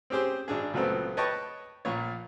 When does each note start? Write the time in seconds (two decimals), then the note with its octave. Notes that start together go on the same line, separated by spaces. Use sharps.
0.10 C4 C#4 G4 G#4 C5
0.48 G#1 D4 G#4
0.73 C#2 A#2 F#3 A3 B3 C4
1.17 B4 C#5 D#5 G5 A5 C#6
1.85 A#1 A#2 C#5